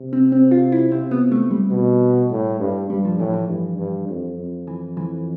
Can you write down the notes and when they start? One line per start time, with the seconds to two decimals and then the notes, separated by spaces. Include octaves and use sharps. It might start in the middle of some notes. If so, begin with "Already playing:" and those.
Already playing: C3
0.13 C4
0.32 C4
0.51 F4
0.72 E4
0.92 C4
1.11 B3
1.32 A3
1.51 G3
1.70 B2
2.30 A2
2.60 G2
2.89 G2 G3
3.05 F3
3.19 A2 E3
3.34 E3
3.48 G2
3.78 G2
4.08 F2
4.38 F2
4.67 E3
4.97 E3